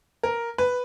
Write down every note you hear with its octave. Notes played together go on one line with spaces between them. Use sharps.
A#4
B4